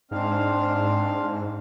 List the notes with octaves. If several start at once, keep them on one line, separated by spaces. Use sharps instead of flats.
G#2 C4 D4 F5